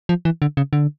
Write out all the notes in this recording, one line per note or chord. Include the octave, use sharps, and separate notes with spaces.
F3
E3
D3
C#3
D3